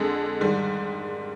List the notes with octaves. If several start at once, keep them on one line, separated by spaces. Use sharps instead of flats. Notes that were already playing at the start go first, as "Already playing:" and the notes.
Already playing: F2 D3 G#3
G#2 D#3 G3